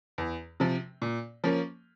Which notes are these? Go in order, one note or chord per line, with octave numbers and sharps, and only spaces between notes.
E2
C3 F3
A#2
F3 A#3 C#4